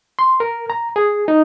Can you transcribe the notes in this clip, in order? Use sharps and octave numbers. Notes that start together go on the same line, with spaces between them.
C6
A#4
A#5
G#4
D#4